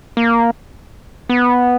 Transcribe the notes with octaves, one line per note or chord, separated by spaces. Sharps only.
A#3
B3